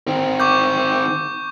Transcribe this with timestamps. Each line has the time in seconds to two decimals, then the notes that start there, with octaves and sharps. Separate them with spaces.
0.07 D#3 C4
0.40 C#6 D6 G6